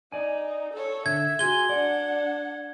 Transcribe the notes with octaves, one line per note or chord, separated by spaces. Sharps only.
D#4 D5 G#5
A4 C#5
D3 E5 G#6
F#4 G#4 G#5 C6 G#6 G7
D4 D5 F#5